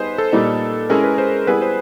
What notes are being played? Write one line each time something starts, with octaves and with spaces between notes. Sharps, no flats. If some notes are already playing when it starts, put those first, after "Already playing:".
Already playing: G3 B3 D#4 G#4 B4 C5
A4
A#2 G3 A#3 D#4
G#3 C#4 E4 G#4 A#4
B4
C5
G3 B3 E4 G#4 B4
C5